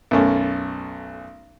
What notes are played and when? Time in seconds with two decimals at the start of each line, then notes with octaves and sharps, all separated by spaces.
0.11 B1 F#2 A3 C#4